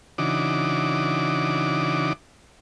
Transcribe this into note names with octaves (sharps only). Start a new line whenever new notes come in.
C#3 E3 D4 D#4 F#4 D6